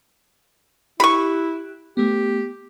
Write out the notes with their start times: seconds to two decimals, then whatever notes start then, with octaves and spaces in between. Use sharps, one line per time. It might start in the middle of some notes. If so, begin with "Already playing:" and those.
1.00 E4 G4 B5 C#6 F#6
1.97 A3 B3 G4